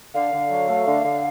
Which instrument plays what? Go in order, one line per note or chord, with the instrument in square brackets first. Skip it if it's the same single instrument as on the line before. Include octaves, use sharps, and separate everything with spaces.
[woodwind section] D3 [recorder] F5
[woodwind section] D3
F#3
A3
D3
D3